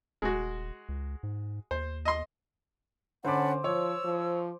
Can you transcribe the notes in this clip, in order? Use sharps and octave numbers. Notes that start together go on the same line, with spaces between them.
D#1 G#3 F#4
C#2
G#2
D#2 C5
D#5 C6
D3 C#4 C5 F#5 A5 B5 D6
F3 C#5 E6
F3